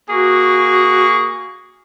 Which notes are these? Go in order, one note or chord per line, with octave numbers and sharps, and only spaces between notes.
A#3 F#4 G#4 C#6